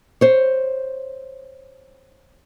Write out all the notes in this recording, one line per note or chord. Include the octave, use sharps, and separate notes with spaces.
C5 C#5